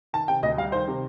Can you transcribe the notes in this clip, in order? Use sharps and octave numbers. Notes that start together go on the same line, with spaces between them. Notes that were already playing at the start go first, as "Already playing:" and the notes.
D#3 A5
C3 G5
D2 D#5
G3 F5
D#3 C5
C3